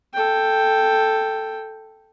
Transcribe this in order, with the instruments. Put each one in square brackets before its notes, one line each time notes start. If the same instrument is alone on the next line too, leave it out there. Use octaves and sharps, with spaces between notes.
[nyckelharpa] A4 G5